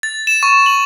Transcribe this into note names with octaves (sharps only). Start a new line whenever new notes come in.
A6
E7
C#6
F#7